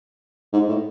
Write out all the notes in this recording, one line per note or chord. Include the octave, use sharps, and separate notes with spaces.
G#2
A2